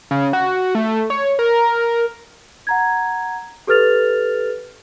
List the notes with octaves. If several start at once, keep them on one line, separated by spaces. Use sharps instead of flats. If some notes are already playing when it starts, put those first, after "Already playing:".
C#3
F#4
A3
C#5
A#4
F#5 A#5 G#6
G4 A4 B4 F6 A6 F7